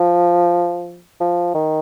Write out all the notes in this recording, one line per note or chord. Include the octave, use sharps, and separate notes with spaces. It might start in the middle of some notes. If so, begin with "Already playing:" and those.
Already playing: F3
F3
D#3